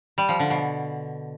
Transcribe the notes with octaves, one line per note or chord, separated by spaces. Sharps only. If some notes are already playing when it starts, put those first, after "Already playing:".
G3
F3
D3
B2